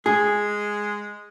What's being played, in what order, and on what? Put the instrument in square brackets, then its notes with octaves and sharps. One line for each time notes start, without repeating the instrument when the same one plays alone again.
[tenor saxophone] G#3 [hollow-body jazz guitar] G#4